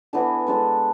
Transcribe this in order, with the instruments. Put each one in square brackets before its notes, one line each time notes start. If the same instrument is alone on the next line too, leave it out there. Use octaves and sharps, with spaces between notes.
[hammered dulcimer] E3 B3 D4 A4
G#3 D4 A4